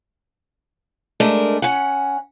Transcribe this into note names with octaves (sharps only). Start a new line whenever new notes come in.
G#3 A3 D4 A#4 D5 D#5
C#4 F#5